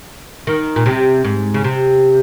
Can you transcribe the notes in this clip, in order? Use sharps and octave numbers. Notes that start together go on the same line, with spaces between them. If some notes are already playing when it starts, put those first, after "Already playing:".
D#3
A#2
C3
G#2
C#3
C3